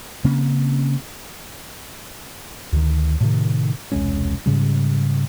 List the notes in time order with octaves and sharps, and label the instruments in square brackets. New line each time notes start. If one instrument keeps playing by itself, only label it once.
[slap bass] C#3 A#3 C4 C#4
[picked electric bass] D2 D#3
A2 C3 D#3
E1 C2 G#3 C#4
G#2 C#3 G3